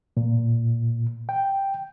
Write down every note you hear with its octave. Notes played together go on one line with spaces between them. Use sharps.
A#2
G5